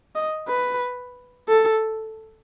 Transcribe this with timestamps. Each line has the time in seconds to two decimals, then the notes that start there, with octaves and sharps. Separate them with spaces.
0.15 D#5
0.48 B4
1.48 A4